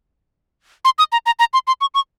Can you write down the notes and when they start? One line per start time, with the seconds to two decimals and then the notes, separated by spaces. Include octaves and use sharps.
0.85 C6
0.99 D#6
1.12 A#5
1.26 A#5
1.39 A#5
1.53 C6
1.67 C6
1.81 C#6
1.95 C#6